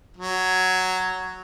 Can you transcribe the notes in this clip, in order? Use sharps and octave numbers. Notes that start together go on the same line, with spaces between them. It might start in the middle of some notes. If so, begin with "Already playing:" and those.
F#3